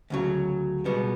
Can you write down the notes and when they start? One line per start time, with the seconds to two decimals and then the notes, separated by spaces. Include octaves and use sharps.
0.10 D2 C#3 F#3
0.85 C#2 B2 G3 B3